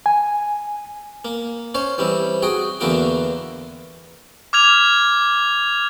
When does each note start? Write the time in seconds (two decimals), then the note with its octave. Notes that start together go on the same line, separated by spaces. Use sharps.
0.06 G#5
1.25 A#3
1.75 C#4 C5 C#5
1.98 E3 G3 C4
2.42 F#4 G#4 G5
2.80 E2 D3 E3 A#3 F#4 G5
4.53 D6 F6 G#6 F7